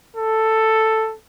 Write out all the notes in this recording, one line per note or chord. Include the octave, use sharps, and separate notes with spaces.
A4